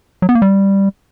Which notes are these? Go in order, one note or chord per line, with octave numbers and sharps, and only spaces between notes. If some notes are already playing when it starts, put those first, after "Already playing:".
F#3
B3
A#3
G3